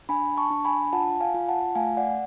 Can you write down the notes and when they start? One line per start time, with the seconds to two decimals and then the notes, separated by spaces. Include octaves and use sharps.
0.09 D4 G#5 B5
0.37 A5 C#6
0.51 D4
0.65 G#5 B5
0.93 F4 F#5 A5
1.21 F5 G#5
1.34 F4
1.49 F#5 A5
1.75 A3 F5 G#5
1.97 D5 F#5